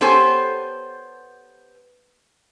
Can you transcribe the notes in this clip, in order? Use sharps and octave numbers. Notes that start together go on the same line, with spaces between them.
B3 G4 A4 C5 C#5 G#5